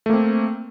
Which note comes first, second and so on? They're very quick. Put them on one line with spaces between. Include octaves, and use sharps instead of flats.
A3 A#3 C4